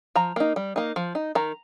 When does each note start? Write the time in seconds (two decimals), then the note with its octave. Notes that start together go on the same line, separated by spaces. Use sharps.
0.16 F3 A#5
0.36 A#3 D#4
0.56 G3
0.76 A#3 D#4
0.96 F3
1.15 D#4
1.35 D#3 A#5